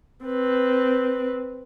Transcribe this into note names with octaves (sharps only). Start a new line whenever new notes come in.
C4 B4